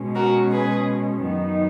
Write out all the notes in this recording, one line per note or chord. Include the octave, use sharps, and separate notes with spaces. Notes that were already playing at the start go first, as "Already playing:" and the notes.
Already playing: B2 G#3 C#4
F#4 A#4
G#4 B4
F#2 D#3 F#3 B3 D#4